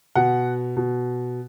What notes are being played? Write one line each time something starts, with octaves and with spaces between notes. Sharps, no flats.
B2 F#5
B2